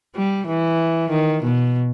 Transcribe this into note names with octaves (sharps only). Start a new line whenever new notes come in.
G3
E3
D#3
B2